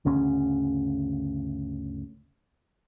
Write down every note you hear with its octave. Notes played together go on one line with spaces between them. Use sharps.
G1 D2 C#3 C#4